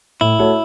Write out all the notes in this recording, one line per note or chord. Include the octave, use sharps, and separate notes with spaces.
A2 E4
A3 F#4 C#5